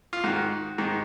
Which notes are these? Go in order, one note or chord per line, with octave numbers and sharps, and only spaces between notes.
F4
G#2 D#3 F#4
G#2 D#3